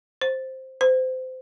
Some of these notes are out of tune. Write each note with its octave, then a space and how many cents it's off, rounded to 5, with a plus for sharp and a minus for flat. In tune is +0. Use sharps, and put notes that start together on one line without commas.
C5 +5
C5 -25